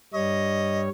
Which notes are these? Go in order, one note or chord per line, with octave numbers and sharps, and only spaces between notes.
G2 G3 C#5 D#5